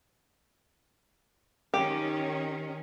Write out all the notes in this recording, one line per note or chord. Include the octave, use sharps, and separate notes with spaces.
D#3 C#4 G4